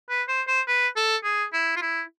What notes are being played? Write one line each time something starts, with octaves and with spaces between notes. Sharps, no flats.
B4
C5
C5
B4
A4
G#4
E4
F4
E4